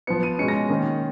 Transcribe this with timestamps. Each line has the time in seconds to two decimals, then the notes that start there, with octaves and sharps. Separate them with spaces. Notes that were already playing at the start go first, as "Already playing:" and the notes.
0.07 F3 B3 C#7
0.23 D#7
0.38 B2 G#3 C#4 C#7
0.48 A#6
0.69 D#3 A#3 C#4